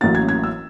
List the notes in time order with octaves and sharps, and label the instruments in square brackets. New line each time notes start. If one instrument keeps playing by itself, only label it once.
[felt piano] A1 A2 F#3 A#3 C#4 A6
G#6
G#6
E6